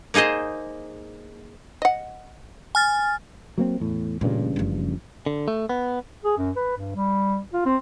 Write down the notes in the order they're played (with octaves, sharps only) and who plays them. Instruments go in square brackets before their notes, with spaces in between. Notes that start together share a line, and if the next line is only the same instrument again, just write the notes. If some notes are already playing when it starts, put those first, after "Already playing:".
[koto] A#3 D#4 G#4 C5 D#5
[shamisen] D#5 F#5
[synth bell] G#5 F6 A6
[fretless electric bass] F#3 A#3 C4
E2 A2
[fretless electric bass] A1 G2 C#3 [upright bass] A#2
[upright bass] F#1 F3
[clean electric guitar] D3
A3
B3
[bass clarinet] G#4
F#2
B4
G2
G3
F4
C4